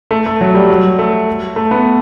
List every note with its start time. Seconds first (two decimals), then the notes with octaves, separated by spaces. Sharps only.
0.11 A3
0.26 A3
0.41 F#3
0.55 G3
0.69 F#3
0.99 A3
1.56 A3
1.71 B3